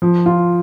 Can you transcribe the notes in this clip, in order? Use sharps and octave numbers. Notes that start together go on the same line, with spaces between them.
F3
F4